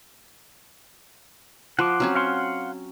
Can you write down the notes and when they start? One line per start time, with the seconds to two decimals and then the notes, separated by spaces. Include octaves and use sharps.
1.79 F3 F#5 C6 D6
2.00 F#3 C4 C#4
2.15 F5 F#5 C6